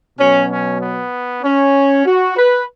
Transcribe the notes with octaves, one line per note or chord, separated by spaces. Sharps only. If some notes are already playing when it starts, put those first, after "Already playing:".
B2 F#3 C#4
C#4
B3
C#4
F#4
B4